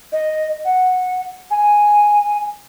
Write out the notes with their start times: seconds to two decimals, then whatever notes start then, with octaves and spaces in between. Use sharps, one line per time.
0.13 D#5
0.65 F#5
1.51 G#5